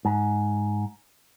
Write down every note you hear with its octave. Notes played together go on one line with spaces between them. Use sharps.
G#2